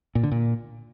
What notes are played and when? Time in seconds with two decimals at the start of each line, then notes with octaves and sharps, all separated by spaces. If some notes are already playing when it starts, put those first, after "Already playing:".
0.15 A#2
0.23 D3
0.32 A#2